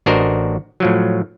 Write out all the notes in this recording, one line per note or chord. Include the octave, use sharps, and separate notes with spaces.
A1 D4 F#4 A#4 C5 D#5
A2 F3 F#3